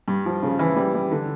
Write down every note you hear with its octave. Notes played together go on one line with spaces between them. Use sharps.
G2
F3
C#3
E3
G3
G3
D3